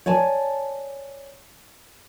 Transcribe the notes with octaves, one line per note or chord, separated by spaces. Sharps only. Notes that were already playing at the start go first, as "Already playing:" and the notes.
C#5 D5 G#5 A5